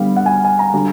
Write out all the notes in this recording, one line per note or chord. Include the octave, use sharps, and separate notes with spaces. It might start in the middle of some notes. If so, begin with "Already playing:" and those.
Already playing: D3 G3 B3 F5
F#5
G#5
G#5
A#5
D3 G3